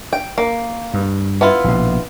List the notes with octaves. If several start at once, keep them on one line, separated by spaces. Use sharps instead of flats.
G5
A#3
G2
B3 E4 F4
A#1 B2